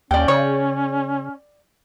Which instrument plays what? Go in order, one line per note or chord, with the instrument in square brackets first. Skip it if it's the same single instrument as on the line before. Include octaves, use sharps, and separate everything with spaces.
[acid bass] D#2 [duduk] C#4 [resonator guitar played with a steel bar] D5 G5
[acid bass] C#3 [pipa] C#5